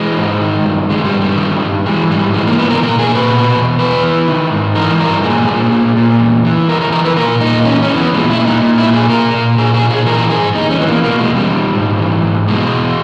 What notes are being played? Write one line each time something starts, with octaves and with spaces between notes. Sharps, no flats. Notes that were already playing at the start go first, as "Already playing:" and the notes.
Already playing: E3 G#3
G#2
D#3
G2
D#3 G#3
G3
G2
G3
D#3
G2
E3 G#3
G#2 G3
E3 G#3
A#3
G#2 B3
A#4
A#2 A#4
G#4
A#2
B4
B2
E2
E2 B4
E3
D#3
G#2
E3 A#4
G2 A#4
A#2 G#4
A#2
A#2
A#2
E2
E3
E2 A#4
A#4
E3 A#4
B4
A#2 A#4
A#2 D#4
E2 C#4
C#4
E3
B3
A#2 G#3
E4
A#2
D#4
A#2
E4
A#2
G#4
A#2 A#4
A#2
A#2 G#4
G#4
A#2
G#4
E3 A#4
G#2 G#4
E2 D#4
C#4
E3 B3
A#3
B2 A#3
G#3
E2
G3
D#3
G#2
E3
G#2
B2 G#3
E2